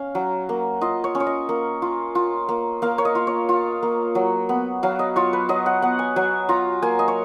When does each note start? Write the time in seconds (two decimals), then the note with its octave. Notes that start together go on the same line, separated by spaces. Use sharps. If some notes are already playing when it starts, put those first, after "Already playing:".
Already playing: C#4 F5
0.15 F#3
0.49 A#3
0.81 F4 D#5
1.04 C#5
1.15 C#4
1.20 C#5
1.26 D#5
1.49 A#3
1.82 F4
2.15 F4
2.49 A#3
2.82 A#3 F5
2.98 C#5
3.05 D#5
3.15 F4
3.27 C#5
3.49 F4
3.82 A#3
4.15 F#3
4.49 B3
4.83 F#3 F5
4.99 D#5
5.16 F4 C#5
5.33 B4
5.49 F#3 D#5
5.66 F#5
5.82 B3 F#5
5.99 G#5
6.16 F#3 G#5
6.49 F4 A#5
6.82 A#3 G#5
6.99 D#5
7.08 C#5